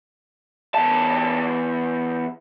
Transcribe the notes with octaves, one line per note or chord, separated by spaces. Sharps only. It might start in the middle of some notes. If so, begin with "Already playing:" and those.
E2 A5